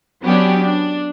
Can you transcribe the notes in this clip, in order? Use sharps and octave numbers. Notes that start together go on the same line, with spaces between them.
F#3 B3 C#4 D4 G4
D4